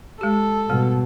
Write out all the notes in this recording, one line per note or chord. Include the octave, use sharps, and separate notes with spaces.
G#3 G4 A4
B2 G3